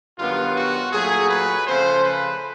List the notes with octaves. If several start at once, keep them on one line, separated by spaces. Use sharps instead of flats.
G2 D#3 F#3 B3 F4
F#4
A#2 F#3 A3 G#4
B4
C#3 F3 A3 C5
B4